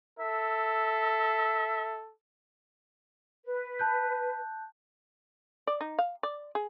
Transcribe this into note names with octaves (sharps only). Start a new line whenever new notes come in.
A4 E5
B4
A5 F#6 G6
D5
D#4
F5
D5
G#4